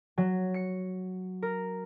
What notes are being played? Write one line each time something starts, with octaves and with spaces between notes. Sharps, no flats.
F#3
C#7
A#4